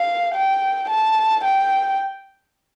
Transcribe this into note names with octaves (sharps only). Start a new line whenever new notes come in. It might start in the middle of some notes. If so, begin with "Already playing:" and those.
Already playing: F5
G5
A5
G5